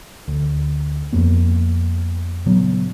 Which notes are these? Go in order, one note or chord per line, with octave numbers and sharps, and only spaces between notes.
D2
F2 A#3 B3
A#2 C#3 F#3 B3